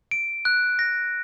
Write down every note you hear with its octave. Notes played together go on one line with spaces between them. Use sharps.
D7
F#6
A#6